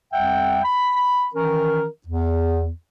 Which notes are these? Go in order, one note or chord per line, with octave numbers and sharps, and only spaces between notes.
F2 G3 E5 F#5 G5
B5
D#3 E3 C#4 A#4
E2